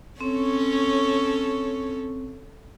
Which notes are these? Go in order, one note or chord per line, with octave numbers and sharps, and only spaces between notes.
C4 C#4 A4 C#5